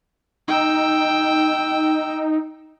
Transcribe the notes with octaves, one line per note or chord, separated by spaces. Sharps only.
D#4 G5 E6